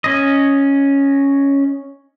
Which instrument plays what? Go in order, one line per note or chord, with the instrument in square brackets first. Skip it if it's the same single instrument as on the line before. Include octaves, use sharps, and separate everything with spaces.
[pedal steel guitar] C#4 D#5